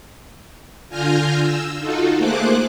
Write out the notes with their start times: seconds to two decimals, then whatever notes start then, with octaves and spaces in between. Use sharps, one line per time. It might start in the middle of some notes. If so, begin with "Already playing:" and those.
0.89 D3 F4 G#5 F6 G6 A#6
1.39 E6
1.78 D#4 F4 F#4 A4
2.18 A3 A#3 G#4 C5 D6 F#6